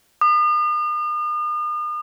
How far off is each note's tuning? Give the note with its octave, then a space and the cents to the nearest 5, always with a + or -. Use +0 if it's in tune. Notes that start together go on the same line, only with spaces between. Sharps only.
D#6 -40